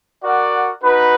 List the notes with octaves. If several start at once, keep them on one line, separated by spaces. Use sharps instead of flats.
F#4 A#4 D5 F#5
D#4 F#4 B4